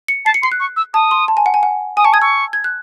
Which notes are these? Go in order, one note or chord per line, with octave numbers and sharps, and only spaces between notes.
C#7
A5 C7
C#7
C6 C7
F#6
C#6
E6
A5 D#6
C6
A5
G#5
F#5
G#5
F#5
G#5 D#6
A5 C#6
D#6 G#6
C#6 E6
G#6
F#6